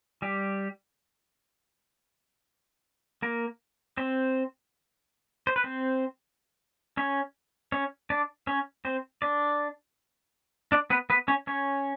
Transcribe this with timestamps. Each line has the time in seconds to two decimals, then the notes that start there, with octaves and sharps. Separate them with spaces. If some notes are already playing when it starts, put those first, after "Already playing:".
0.22 G3 G4
3.22 A#3 A#4
3.97 C4 C5
5.47 C5
5.56 B4
5.64 C4 C5
6.97 C#4 C#5
7.72 C#4 C#5
8.10 D4 D5
8.47 C#4 C#5
8.85 C4 C5
9.22 D4 D5
10.72 D4 D5
10.90 B3 B4
11.10 B3 B4
11.28 C#4 C#5
11.47 C#4 C#5